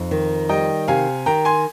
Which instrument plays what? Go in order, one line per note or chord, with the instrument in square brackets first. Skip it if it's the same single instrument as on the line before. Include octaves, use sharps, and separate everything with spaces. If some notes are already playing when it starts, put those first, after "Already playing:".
Already playing: [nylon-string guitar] F2 D#4
D#3
[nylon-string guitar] G3 [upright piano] D#5 G5
[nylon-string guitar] C3 [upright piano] F5 G#5
[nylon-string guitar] D#3 [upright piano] G5 A#5
[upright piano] G#5 C6